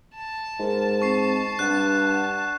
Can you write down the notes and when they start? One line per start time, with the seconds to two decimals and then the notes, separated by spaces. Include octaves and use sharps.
0.15 A5
0.59 G#2 A#4
1.02 C4 C#6 C7
1.59 G2 F#5 F#6